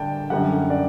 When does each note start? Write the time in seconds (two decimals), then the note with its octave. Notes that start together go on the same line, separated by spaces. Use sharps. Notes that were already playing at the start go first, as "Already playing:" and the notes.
Already playing: D3 G3 D4 G5 A5
0.30 F#2 D3 G3 F#5
0.70 D5